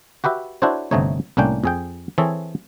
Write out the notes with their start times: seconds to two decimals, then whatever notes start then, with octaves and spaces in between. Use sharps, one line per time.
0.24 F#4 G4 B4 E5
0.62 D4 E4 F#4 A4 C5 C#5
0.91 G1 G2 C3 A3 D#4 C#5
1.37 C2 A2 A#3 C#4 D4 G5
1.64 F2 G#4 G5
2.18 E3 C4 G#4 A4 C#5